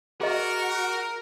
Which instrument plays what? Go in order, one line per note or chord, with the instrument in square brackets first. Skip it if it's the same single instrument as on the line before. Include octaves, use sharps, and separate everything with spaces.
[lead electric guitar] F#4 [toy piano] G#4 D#5 [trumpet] A#4